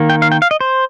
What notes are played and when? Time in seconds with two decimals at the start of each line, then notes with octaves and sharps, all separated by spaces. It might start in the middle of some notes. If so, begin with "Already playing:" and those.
Already playing: D#3 A#3
0.10 G5
0.22 F5
0.32 G5
0.42 F5
0.51 D#5
0.61 C5